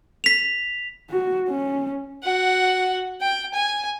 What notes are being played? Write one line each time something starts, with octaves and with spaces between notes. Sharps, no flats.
B6 F7
F#4
C#4
F#4 F#5
G5
G#5